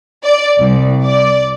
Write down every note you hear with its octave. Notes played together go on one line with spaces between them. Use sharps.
D5
C2
D5